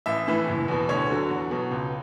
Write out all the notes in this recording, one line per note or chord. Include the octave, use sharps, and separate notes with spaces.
A1 E5
A2 E3
F#1
E2 B2
D2 C#5
D3 F#3
E2
B2 F#3
C#2